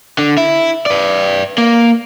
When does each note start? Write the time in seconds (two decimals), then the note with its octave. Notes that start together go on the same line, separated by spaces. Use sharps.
0.19 D3
0.38 E4
0.86 B4 D5
1.58 A#3